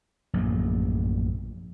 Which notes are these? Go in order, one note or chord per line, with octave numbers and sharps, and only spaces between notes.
A#1 F#2 A2